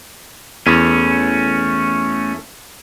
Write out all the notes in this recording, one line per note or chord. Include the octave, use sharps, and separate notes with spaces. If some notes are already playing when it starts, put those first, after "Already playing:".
E2 A3 C#4